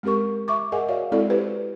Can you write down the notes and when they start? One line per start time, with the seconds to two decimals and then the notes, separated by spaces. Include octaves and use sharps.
0.03 G#3 C4 G4 A#4 C#6
0.48 E5 C#6 D6
0.72 G#4 A#4 D#5 F#5 G#5
0.88 F#4 C#5 D5 E5 F5
1.12 G#3 C4 E4 A4 D5
1.30 E4 G4 B4 C5